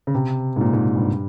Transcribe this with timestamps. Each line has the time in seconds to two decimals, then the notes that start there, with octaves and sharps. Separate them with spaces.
0.07 C#3
0.14 C3
0.56 G#2
0.61 A#2
0.73 G#2
0.96 G2